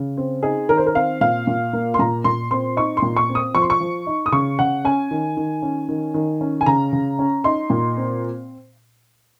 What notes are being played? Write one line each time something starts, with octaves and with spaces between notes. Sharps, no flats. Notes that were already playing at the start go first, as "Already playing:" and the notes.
Already playing: C#3
C4
D#4 G#4
D#3 A#4
C5
A#4
C4 F5
A#2 F5
A#2
A#3
C6
A#2 A#5
A#2 C6
C4 C6
D#4 C#6
C6
A#2
C#6
C4
D#6
F3 C#6
C6
C#6
F3
D#4
D#6
C#3 C#6
C#3 F#5
C#4 G#5
D#3
D#3
C#4
D#3
D#3
C#4
G#5
C#3 A#5
C#3
C#4
D#4 C6
A#2
C4